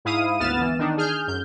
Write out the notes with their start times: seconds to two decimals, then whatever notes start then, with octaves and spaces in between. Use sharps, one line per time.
0.05 G#2 E4 F5 D#6 D#7
0.40 G#1 D2 B3 F6 A6 E7
0.61 E3
0.79 D#3 D4 D#4
0.97 G#4 F6 G6
1.27 F#2 G6